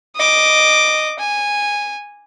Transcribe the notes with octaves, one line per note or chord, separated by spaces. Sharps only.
D#5 D6
G#5